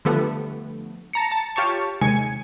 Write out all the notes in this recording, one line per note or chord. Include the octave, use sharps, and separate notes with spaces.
D3 F3 G3 A3 B3
A5 A#5 C#7
A5
F4 G4 C#5 A5 C#6
D#2 C3 G#3 G#5 G#6 C#7